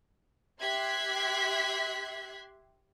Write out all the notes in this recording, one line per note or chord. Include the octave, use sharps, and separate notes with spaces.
G4 E5 C6 F#6 G#6 B6